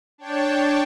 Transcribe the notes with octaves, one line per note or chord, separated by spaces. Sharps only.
D4 C#5 G5 A5